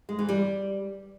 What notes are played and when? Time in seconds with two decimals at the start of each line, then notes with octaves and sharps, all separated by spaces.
0.09 G#3
0.19 E3
0.29 G3